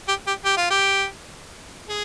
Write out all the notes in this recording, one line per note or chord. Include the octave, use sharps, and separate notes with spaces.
G4
G4
G4
F4
G4
G#4